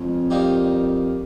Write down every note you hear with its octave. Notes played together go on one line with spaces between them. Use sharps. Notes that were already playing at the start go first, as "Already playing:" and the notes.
Already playing: F2 G#3 C#4
D#3 G3 A#3 D#4 G4